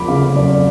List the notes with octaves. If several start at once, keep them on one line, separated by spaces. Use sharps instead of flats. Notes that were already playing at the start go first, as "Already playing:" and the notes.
Already playing: F3 A3 B5 D6
C#3 F5
F#2 D5